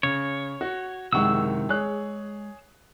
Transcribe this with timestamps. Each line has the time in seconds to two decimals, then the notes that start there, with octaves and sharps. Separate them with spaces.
0.03 C#3 C#5
0.61 F#4
1.13 F#1 C3 D#3 G#3 F#5 C#6 E6
1.69 G#3 G#4 C#5 F#6